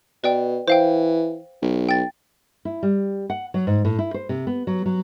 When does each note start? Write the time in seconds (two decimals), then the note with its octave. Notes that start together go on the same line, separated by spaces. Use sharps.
0.24 B2 B4 D5 G5
0.68 E3 C5 F5 G5
1.62 B1
1.89 G5 A6
2.65 E4
2.83 G3
3.30 F#5
3.54 F#3
3.67 G#2
3.85 A2
3.99 E4
4.14 C5
4.29 C3
4.47 B3
4.67 F#3
4.86 F#3